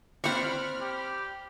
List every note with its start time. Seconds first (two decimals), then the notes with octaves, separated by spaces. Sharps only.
0.24 C4 D4 F#5 B5 C#6 F6
0.81 G4